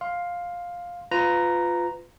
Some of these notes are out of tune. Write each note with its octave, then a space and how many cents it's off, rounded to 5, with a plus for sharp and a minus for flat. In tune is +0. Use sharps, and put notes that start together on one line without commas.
F5 +10 C6 +0
F4 +5 B4 +25 A#5 +0